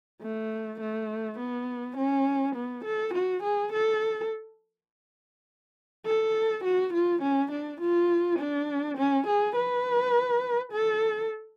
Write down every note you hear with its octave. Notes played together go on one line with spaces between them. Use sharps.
A3
A3
B3
C#4
B3
A4
F#4
G#4
A4
A4
F#4
F4
C#4
D4
F4
D4
C#4
G#4
B4
A4